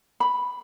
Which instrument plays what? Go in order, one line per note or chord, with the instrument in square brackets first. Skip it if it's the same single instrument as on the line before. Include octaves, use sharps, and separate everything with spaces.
[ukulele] B5